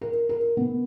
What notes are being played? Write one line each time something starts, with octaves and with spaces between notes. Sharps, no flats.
A#4
A#4
B3